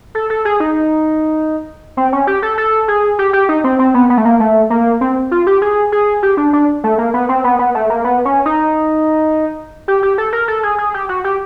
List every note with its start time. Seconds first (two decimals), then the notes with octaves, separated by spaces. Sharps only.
0.15 A4
0.30 A4
0.45 G#4
0.60 D#4
1.97 C4
2.13 C#4
2.27 G4
2.42 A4
2.58 A4
2.88 G#4
3.19 G4
3.33 G4
3.49 D#4
3.64 C4
3.79 C4
3.94 B3
4.10 B3
4.18 A3
4.25 A#3
4.40 A3
4.70 A#3
5.01 C4
5.31 F4
5.47 G4
5.62 G#4
5.92 G#4
6.23 G4
6.37 D4
6.53 D4
6.84 A3
6.98 A#3
7.14 B3
7.29 C4
7.44 B3
7.59 B3
7.75 A3
7.90 A#3
8.04 B3
8.25 C#4
8.46 D#4
9.88 G4
10.03 G4
10.18 A4
10.33 A#4
10.48 A4
10.63 G#4
10.78 G#4
10.94 G4
11.09 F#4
11.24 G4